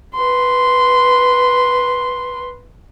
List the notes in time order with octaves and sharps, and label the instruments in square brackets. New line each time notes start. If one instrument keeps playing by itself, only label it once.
[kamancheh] B4 C6